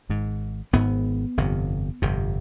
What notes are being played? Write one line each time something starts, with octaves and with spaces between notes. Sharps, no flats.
G#1 G#2
G#1 G#2 B3
G1 F2 C3
G1 F2 C3